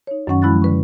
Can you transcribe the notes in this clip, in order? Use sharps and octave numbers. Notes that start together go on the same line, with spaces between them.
D#4 C#5
F#2 D#3 F#3 C#4 F#5 C#6
F3 G#3 E4 B5 F#6 A6
D3 B4 C#6